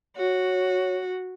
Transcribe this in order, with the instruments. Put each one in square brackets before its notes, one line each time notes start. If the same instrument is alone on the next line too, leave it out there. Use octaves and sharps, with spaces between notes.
[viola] F#4 [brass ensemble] C#5